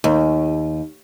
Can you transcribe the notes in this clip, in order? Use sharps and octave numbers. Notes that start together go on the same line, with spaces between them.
D#2